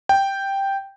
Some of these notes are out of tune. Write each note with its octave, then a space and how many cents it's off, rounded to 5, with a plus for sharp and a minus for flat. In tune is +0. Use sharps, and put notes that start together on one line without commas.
G5 +0